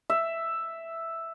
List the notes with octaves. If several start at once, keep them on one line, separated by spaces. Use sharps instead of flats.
E5